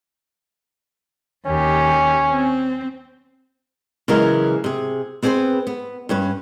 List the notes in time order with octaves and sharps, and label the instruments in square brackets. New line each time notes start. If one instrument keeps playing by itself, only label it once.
[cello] D#2 G4 [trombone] C#4
[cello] C4
[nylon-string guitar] C#3 E3 F#3 G#3 A#4
C3 G#4
B3 C4 G#4 A4 B4 C5
B3
G2 C#4 B4